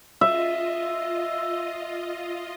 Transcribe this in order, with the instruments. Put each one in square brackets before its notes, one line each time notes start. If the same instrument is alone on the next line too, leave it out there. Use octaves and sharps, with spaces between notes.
[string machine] F4 D#5 [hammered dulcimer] E5